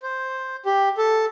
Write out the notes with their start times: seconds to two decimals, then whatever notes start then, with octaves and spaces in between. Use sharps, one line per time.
0.03 C5
0.66 G4
0.98 A4